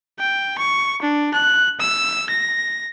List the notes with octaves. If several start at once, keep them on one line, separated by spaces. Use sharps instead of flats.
G5
C#6
D4
F#6
E6
A#6